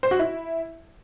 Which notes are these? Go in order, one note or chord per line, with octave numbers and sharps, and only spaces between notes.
C5
F#4
E4